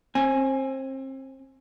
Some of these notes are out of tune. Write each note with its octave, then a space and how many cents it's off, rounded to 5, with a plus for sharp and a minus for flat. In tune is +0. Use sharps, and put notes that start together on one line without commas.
C4 +30 G#5 +0